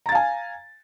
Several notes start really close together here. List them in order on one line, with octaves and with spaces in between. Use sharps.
A#5 A6 F5 G#5